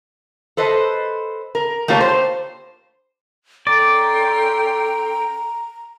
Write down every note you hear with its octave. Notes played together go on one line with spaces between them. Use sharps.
A4 B4 C5 D#5
A#4
A3 A#3 F4 G4 C#5
C5
C#4 A4 D5 G5 A#5 C6